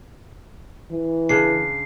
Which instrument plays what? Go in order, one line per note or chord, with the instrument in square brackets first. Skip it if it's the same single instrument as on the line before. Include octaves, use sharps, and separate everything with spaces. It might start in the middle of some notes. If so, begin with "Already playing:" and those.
[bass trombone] E3
[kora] C#3 D4 [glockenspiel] C7